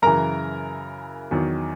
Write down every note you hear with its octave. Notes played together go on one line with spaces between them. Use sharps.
F#2 C#3 E3 A#4 A#5
E2 D#3 F#3